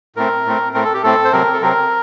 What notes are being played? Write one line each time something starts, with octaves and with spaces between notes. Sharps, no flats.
A2 A3 C4 A#4
A2 A3 C4
A2 A3 C4 A#4
A4
G4
A2 A3 C4 A4
C5
C3 F#3 C4 A#4
A4
C3 F#3 C4 A#4